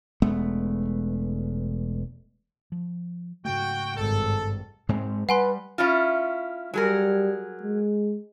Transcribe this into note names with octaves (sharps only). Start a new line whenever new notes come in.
E1 G#3 A3 B3
F3
G#2 C#3 A3 F#4 G5
G#1 G2 A4
G#2 G#3 C4
G3 B4 F#5 G#5 C6
C#4 E4 F4
F#3 G3 G#4 A#4
G#3